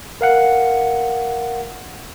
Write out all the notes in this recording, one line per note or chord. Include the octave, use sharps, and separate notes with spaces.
A#4 F5 F#5